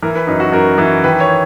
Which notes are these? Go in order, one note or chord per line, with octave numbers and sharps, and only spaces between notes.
E3 A#4
B4
F#2 D#4
F#4
F#2 A#4
E3
D#3 B4
C#5